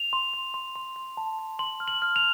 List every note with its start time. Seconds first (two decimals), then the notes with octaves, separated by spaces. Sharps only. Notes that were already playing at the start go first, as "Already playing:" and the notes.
Already playing: F7
0.13 C6
0.34 C6
0.54 C6
0.76 C6
0.96 C6
1.17 A5
1.39 A5
1.59 C6 F#7
1.80 F6
1.88 F#7
2.02 F6
2.16 F7